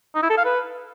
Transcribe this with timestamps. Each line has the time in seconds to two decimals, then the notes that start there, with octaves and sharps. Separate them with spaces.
0.15 D#4
0.23 E4
0.30 A4
0.37 F5
0.45 B4